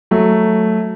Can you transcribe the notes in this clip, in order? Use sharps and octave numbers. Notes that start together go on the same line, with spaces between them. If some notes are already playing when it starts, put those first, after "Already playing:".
F#3 A3